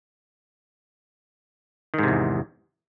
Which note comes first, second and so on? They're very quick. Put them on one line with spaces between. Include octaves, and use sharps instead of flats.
D#3 G#2 C3 E2